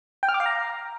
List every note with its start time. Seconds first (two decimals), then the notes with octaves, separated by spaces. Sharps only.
0.23 G5
0.29 F6
0.34 D6
0.40 F5
0.46 A#5